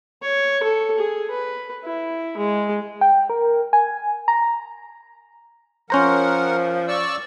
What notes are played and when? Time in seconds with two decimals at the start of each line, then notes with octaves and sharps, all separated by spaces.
0.22 C#5
0.63 A4
0.98 G#4
1.30 B4
1.84 E4
2.37 G#3
3.01 G5
3.30 A#4
3.73 G#5
4.28 A#5
5.90 F3 C#4 A#4 C5 F#5 A#5
6.88 D5 C#6 E6